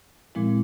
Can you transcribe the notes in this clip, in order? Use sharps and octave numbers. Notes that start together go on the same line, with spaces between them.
A#2 F3 G#3 C4 E4